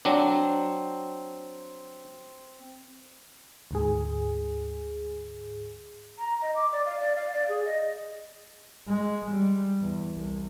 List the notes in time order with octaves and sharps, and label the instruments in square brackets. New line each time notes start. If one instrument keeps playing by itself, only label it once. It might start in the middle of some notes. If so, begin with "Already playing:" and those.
[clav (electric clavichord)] F#3 D4 [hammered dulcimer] C4
[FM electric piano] D2 G#2 G#4
[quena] A#5
D#5
D6
D5
F5
D5
F5
D5
G#4
D#5
[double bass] G#3
G3
E2
C2